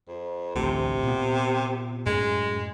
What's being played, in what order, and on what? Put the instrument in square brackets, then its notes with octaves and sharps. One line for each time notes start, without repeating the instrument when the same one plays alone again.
[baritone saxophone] F2
[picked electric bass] A1 D2 [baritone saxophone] C3
[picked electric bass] A#2 B3
[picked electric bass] F#2 A2 [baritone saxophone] G#3